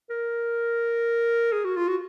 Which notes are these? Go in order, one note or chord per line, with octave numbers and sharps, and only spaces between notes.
A#4
G#4
F#4
F4
F#4